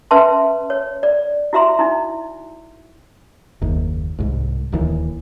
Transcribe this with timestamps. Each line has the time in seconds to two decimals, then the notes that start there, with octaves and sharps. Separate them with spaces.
0.11 C#4 B4 E5 A5 C6
0.70 C#5
1.03 D5
1.53 E4 F#4 E5 A#5 C6
1.79 D#4 E4
3.61 F#1 D#2
4.19 C2 G#2
4.72 D1 D#2 E3